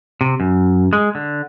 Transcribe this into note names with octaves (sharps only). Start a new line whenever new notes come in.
C3
F#2
G#3
D3